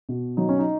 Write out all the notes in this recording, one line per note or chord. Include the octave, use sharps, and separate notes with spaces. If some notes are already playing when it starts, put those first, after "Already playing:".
B2
F#3 D#4
C#4
D#4